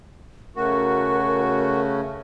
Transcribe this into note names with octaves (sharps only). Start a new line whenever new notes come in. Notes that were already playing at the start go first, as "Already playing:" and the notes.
C#3 A3 C#4 F#4 A#4